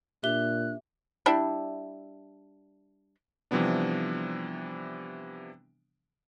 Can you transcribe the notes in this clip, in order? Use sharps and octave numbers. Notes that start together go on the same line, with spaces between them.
A#2 D4 G4 E5 F#6 G7
G3 D4 E4
C3 E3 F3 G3 B3 D4